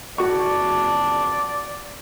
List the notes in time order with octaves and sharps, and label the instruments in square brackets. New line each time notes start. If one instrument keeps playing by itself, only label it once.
[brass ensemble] F#1 F2 A5 [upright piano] F#4 C#6 [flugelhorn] D5